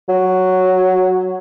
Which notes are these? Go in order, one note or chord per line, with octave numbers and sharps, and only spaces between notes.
F#3